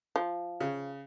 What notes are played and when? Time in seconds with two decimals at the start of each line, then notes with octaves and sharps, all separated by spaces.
0.16 F3
0.61 C#3